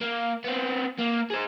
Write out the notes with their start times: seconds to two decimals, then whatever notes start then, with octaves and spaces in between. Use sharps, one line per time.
0.01 A#3
0.44 B3 C4
0.98 A#3
1.30 G#4 C5